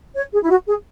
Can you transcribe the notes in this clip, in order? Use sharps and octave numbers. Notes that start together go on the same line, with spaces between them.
C#5
G#4
E4
F#4
G#4